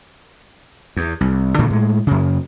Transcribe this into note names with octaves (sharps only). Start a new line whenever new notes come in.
E2
C2
A#2 D3 D#3 A3
A2 G#3
F#2 C#3